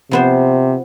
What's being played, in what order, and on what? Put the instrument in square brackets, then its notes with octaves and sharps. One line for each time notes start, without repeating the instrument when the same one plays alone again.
[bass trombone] C3 [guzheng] F3 B3 C5